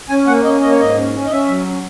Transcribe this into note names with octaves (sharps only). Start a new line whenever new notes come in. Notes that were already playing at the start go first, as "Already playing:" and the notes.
C#4 G#5
A#3 F#5
C#4 D#5
A#3 D#5
C#5
G#2 D#5
C#4
C#4
D#5
C#4 E5
F#3
C#4